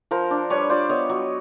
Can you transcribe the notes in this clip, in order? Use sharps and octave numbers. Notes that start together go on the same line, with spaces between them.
F3 A#4 C5
D4
G3 B4 C#5
F4 C5 D5
B3 C#5 D#5
F#3